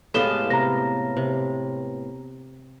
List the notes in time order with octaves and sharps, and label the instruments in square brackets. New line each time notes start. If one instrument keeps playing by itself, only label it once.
[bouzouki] A2 B3 F5 [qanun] G#3 G4 [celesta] A4 E7 G7
[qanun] C3 [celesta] A#5 A#6
[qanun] C3